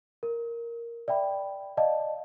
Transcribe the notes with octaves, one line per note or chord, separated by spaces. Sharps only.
A#4
D5 E5 G5 B5
D5 D#5 F5 A5